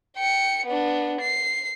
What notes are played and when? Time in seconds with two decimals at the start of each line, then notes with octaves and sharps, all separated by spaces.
0.17 G5 C#7
0.66 B3 D4
1.21 C7